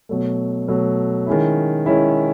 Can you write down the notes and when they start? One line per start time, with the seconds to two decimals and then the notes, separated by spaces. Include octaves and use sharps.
0.09 B2 F#3 A3
0.68 B2 F#3 A3
1.27 D#3 G#3 C#4 E4
1.86 D#3 G#3 C#4 E4